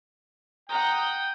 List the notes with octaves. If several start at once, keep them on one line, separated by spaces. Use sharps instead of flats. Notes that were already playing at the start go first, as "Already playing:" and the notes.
F#5 G5 A#5 D#6 G6